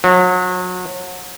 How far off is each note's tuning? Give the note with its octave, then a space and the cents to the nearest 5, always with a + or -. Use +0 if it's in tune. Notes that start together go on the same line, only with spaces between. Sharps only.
F#3 -35